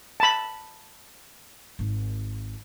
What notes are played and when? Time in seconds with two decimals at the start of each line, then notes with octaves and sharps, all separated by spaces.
0.20 A5 B5
1.79 G#1